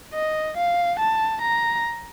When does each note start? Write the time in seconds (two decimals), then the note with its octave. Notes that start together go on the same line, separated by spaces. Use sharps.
0.14 D#5
0.57 F5
1.00 A5
1.41 A#5